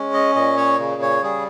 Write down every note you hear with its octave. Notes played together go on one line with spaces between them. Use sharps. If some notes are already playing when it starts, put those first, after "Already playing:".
Already playing: G#3 C#4
D#5
A#2 D#5
C#5
C#3
C#5
G3 G#4